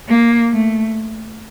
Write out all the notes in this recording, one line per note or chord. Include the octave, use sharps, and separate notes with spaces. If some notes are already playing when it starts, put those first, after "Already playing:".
A#3
A3